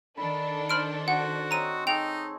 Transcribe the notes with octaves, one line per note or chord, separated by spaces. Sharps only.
D#3 D4 A4 B5
C5 B5 F6 D7
F#4 F#5
C4 C#5 D#5 A#5 D#7
D#4 G#4 A4 G5 F7